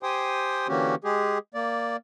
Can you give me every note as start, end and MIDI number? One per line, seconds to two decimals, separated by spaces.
0.03 0.67 67
0.03 0.67 72
0.03 0.67 79
0.03 0.67 80
0.03 0.67 84
0.03 0.67 87
0.68 0.95 50
0.68 0.95 52
0.68 0.95 58
0.68 0.95 61
0.68 0.95 66
0.68 0.95 67
1.04 1.38 56
1.04 1.38 67
1.04 1.38 68
1.55 1.97 58
1.55 1.97 74